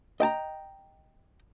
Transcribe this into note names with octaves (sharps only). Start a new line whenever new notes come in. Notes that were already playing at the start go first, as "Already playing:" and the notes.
D#5 G5 A5 A#5